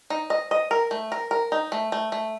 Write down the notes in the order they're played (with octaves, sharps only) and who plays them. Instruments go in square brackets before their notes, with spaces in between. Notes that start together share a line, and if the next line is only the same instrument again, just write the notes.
[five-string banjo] D#4
D#5
D#5
A#4
A3
A#4
A#4
D#4
A3
A3
A3